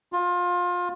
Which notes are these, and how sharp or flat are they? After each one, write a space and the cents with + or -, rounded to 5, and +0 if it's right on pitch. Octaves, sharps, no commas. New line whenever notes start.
F4 +25